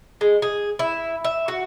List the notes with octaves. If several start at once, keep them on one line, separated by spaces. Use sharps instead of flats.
G#3
G#4
E4
E5
F#4